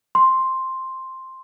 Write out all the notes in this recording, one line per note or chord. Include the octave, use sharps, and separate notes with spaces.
C6